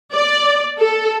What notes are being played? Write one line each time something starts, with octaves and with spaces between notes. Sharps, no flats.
D5
A4